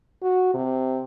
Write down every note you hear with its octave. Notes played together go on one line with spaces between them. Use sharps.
F#4
C3